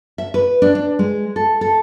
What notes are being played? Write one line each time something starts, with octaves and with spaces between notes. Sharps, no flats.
E5
B4
D4
D4
G#3
A4
A4